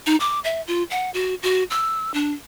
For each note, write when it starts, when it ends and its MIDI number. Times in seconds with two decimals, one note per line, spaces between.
0.06 0.16 63
0.20 0.40 86
0.44 0.62 76
0.67 0.83 65
0.90 1.10 78
1.14 1.34 66
1.43 1.64 66
1.70 2.13 88
2.14 2.33 62